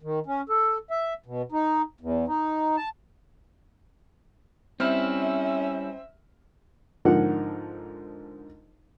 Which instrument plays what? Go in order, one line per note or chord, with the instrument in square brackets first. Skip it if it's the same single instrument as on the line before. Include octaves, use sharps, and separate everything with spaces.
[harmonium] D#3
C#4
A4
E5
B2
D#4
E2
D#4
A5
[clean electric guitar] G3 E4 [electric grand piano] C4 F6 [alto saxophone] C#4 [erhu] E5
[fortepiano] G#2 D3 F3 D#4 A#4 F#5